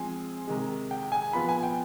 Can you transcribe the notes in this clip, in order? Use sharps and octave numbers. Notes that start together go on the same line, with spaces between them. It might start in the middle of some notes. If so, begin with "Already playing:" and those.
Already playing: F3 G#3 C4 G#5
C3 D#3 G#3
G5
G#5
F3 B3 F4 B5
G#5
G5